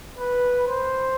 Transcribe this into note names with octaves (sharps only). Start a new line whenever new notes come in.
B4
C5